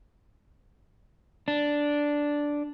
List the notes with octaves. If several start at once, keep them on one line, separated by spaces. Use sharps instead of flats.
D4